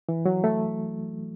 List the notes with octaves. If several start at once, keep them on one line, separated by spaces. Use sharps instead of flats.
E3
F#3
A3